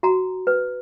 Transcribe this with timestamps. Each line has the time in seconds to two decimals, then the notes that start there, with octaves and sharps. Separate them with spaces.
0.03 F#4 A#5
0.47 B4